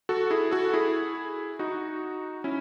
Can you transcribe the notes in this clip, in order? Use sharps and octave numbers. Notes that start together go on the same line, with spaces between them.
F#4 A4
E4 G#4
F#4 A4
E4 G#4
D#4 F#4
C#4 E4